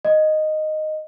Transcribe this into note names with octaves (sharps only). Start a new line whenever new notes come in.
D#5